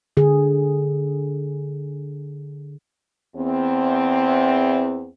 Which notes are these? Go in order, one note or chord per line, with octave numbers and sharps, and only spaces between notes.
D3 G#4
E2 C4